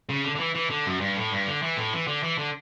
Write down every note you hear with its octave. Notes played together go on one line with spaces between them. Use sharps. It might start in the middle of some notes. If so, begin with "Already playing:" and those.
C#3
D3
D3
E3
E3
D3
F#2
G2
A2
G2
D3
E3
A2
E3
D3
E3
D3